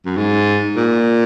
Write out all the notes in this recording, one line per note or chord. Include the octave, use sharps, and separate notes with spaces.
F#2
G#2
A#2